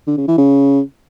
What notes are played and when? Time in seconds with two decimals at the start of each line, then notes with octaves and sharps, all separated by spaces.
0.07 D3
0.17 C#3
0.28 E3
0.38 C#3